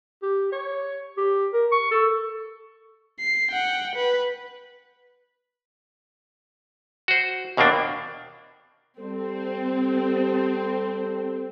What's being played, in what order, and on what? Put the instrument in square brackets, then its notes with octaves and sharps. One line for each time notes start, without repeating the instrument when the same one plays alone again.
[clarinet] G4
C#5
G4
A#4
C#6
A4
[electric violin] C7
F#5 G5
B4
[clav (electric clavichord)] F#4 C5
D#2 B2 A#3 C4 D4
[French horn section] G3 A4 [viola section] C4